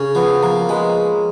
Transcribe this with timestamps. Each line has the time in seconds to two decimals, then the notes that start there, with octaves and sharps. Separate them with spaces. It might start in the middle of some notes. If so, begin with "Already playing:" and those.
Already playing: C#3 C#4
0.15 F3 B3
0.42 F3 A#3
0.69 G#3 B3